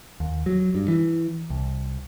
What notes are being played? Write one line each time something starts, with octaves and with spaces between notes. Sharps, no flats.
D#2
F#3
G2
E3
C2